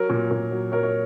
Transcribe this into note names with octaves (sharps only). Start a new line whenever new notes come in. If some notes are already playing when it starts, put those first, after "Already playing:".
Already playing: F#3 A#4 C#5
A#2
A#2
F#3
F#3 A#4 C#5
C#5